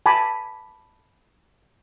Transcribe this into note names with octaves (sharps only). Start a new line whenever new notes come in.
G#5 A5 B5 D6